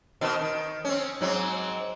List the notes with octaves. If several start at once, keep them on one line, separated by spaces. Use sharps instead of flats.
B2 D#3 C4
D#3
C4 C#4
G#2 F#3 C4